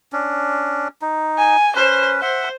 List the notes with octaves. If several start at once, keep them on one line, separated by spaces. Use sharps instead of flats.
C#4 D4
D#4
G#5
C#4 B4 C5
C5 E5 F#5